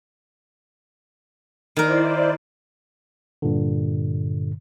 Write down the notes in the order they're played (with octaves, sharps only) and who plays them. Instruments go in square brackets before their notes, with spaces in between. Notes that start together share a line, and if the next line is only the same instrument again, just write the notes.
[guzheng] D#3 A#4 [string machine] E4 C5 D5
[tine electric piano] G2 A#2 D3